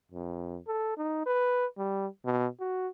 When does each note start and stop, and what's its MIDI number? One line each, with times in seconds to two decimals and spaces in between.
0.12 0.59 41
0.67 0.96 69
0.98 1.26 63
1.26 1.66 71
1.78 2.07 55
2.25 2.47 47
2.60 2.88 66